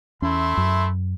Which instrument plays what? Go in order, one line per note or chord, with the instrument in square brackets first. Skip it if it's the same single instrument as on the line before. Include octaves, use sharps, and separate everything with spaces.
[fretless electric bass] E2 C#4 [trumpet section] A3 E4 C6
[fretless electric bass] F#2